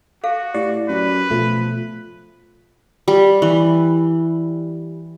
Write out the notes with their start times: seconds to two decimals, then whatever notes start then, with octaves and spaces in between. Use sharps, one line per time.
0.24 F#4 A4 F5
0.54 A2 G4 D5
0.89 F#2 B4
1.30 B2 F3 A3
3.08 G3
3.42 E3